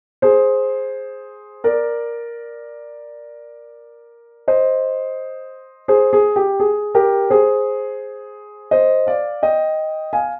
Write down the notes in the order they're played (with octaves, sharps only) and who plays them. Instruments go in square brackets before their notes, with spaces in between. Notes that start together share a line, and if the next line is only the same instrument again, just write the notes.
[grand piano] G#4 C5
A#4 D5
C5 D#5
G#4 C5
G#4
G4
G#4
G4 A#4
G#4 C5
C5 D#5
D5 F5
D#5 G5
F5 G#5